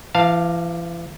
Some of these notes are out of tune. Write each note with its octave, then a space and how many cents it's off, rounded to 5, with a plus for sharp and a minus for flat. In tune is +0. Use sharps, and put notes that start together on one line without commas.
E3 +40 F5 +0 A5 +0